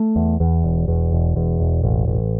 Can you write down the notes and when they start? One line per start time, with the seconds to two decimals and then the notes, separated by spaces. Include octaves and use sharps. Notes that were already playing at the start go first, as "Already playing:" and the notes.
Already playing: A3
0.16 E2
0.40 E2
0.64 E1
0.88 E2
1.12 E1
1.36 E2
1.60 E1
1.83 A1
2.08 A1